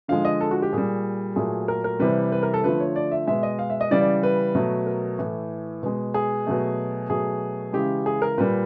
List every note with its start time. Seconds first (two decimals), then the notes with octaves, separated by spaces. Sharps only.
0.08 D3 F3 G#3 F5
0.25 D#5
0.41 A4
0.51 F#4
0.62 G4
0.73 A#2 G3 G#4
1.36 A#2 F#3 A3 G#4
1.68 A#4
1.84 A#4
2.00 C3 E3 G3 B4
2.32 B4
2.43 A#4
2.54 A4
2.64 D3 F3 A3 B4
2.80 C#5
2.96 D5
3.12 E5
3.27 B2 G#3 E5
3.43 D#5
3.59 F5
3.70 E5
3.81 D#5
3.91 C#3 E3 G3 D5
4.01 D5
4.23 B4
4.55 B2 F#3 A3
4.86 A#4
5.18 A2 E3 A3
5.83 B2 G#3
6.14 G#4
6.47 B2 F#3 A3
7.10 B2 F#3 A3 G#4
7.73 C#3 E3 G#3 G4
8.06 G#4
8.22 A#4
8.38 A#2 G3 B4